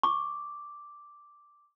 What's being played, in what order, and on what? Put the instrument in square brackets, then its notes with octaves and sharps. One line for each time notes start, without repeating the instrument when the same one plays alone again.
[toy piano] C#6 [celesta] D6